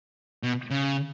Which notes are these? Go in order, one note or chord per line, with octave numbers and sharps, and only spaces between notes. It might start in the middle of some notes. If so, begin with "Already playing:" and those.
B2
C#3